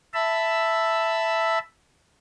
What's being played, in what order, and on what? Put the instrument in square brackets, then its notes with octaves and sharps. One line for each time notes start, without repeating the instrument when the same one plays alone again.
[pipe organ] E5 A5 B5 E6